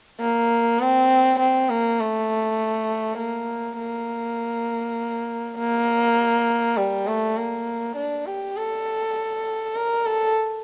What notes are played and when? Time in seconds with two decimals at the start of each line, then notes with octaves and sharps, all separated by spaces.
0.20 A#3
0.80 C4
1.39 C4
1.69 A#3
2.00 A3
3.18 A#3
3.79 A#3
5.58 A#3
6.77 G3
7.07 A3
7.37 A#3
7.96 D4
8.26 G4
8.56 A4
9.76 A#4
10.05 A4